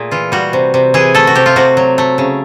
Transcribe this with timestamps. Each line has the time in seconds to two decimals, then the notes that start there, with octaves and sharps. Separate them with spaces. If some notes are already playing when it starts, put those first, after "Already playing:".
Already playing: A#2 A3 G#4
0.11 E3 F4
0.32 G3 F#4
0.53 C3
0.74 C3
0.94 E3 G#4
1.15 A3 A4
1.27 F#4
1.35 C3 G4
1.46 F4
1.56 C3 F#4
1.77 F#3
1.98 A3
2.18 C#3